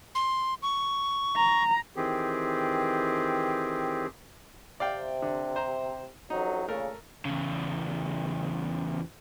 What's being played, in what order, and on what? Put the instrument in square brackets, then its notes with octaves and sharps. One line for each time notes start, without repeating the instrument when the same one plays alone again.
[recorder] C6
C#6
[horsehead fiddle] A#5
[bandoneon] D#3 E3 C4 G4 G#4
[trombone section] C3 [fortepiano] D5 F5 G5
[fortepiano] D3
C5 A#5
[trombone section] A1 F2 F#3 [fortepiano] D#4
[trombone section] A#2 C#3 [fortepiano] A3 A#4
[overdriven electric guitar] E2 C#3